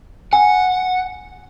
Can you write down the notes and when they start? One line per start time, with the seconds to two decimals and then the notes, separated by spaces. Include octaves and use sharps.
0.33 F#5 G#5